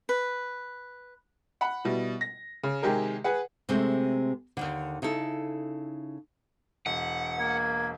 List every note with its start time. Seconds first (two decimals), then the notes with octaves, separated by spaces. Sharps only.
0.09 B4
1.61 F#5 B5
1.84 B2 G3 E4
2.21 A#6
2.64 C#3
2.82 C3 D#3 G#3 G4 G#4 A#4
3.24 G#4 B4 F#5
3.69 C3 G#3 A3 C4
4.57 D#2 G#2 D3
5.02 C#3 D#4 E4 A4
6.86 E1 F#5
7.40 A#3 G#6